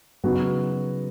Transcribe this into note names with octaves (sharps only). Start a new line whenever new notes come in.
C#3 F#3 B3 D#4 F#4